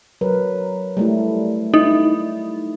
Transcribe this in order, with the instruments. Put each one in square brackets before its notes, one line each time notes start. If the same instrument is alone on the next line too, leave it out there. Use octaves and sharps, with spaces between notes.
[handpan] F#3 A#4 B4
G3 A3 E4
[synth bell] D#4 [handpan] E4